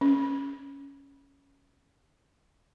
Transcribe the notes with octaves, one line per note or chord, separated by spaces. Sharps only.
C#4